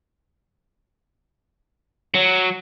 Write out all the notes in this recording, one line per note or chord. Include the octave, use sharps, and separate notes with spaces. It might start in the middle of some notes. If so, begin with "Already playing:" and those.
F#3